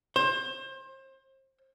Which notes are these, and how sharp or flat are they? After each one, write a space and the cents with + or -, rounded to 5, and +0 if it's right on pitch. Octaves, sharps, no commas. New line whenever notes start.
C5 +30